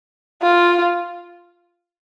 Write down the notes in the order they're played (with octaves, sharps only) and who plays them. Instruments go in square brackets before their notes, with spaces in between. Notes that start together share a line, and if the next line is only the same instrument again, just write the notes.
[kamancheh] F4